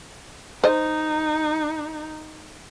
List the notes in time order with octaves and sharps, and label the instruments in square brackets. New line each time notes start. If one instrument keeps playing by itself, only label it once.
[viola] D#4 [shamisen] C5 D#5